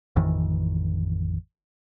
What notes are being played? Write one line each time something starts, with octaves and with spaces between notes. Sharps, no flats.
A1 F2 D#3 E3